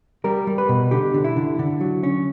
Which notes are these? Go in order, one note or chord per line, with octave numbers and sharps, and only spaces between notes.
G3 A#4
G3
B4
B2
D3 G4
D3
E4
D3
D3
F#3
C#4